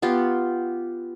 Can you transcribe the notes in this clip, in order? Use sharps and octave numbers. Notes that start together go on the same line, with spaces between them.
B3 F4 G4